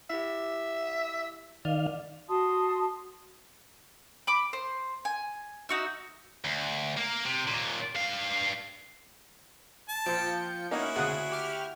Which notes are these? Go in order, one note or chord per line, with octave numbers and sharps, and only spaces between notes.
E4 G4 E5
D#3 D5 F5
F#4 A5 C6 D#6
B5 D6
C5
G#5
D#4 F#4 E5
D2
A#3 A#4
C3
D#2 A#2
G2 F5
A5
A#2 F3 G5 C#7
A#3 C#4 D#4 E4 F#4
D2 C#3 G#4 F#5
G4 F6